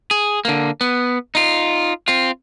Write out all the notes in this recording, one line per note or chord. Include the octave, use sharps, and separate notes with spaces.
G#4
D3 A#3
B3
D#4 F4
C4 F4